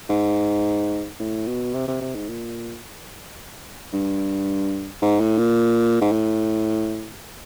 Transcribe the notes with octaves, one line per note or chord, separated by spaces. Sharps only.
G#2
A2
B2
C3
C3
C3
G#2
A#2
G2
G#2
A2
A#2
G#2
A2